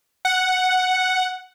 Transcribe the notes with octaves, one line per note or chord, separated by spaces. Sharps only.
F#5